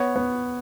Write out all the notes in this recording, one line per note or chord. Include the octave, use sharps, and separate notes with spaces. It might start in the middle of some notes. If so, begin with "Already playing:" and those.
Already playing: B3 C#5
B3